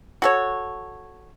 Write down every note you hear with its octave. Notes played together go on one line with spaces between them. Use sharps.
F#4 A4 C#5